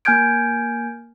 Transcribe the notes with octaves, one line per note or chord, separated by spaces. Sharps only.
A#3 G#5 F6 G6 G#6 D7